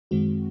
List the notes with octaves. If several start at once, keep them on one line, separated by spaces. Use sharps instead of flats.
F#2 D#3 G#3 C4 F#4